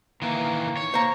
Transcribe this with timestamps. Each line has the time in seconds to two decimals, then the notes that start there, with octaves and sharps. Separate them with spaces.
0.22 D#3 E3 A#3
0.77 C#5
0.94 A#3 C5 A#5